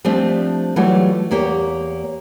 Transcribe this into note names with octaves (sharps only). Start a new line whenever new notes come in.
F3 G3 A3 C4 D4 C5
E3 F#3 G3 A3 F4
E2 A#3 G4 C#5